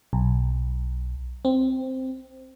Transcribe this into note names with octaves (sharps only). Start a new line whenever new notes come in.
B1
C4